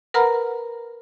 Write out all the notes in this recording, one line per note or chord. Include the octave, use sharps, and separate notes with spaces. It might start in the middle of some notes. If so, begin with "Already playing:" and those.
A#4 B4 F#5 A#5 B5 F6